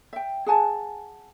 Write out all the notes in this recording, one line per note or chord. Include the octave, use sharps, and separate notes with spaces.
E5 G5
G#4 F#5 G#5 A5